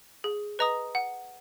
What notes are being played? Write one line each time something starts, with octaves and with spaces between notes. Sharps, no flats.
G#4
B4 D#5 A#5 D#6
F#5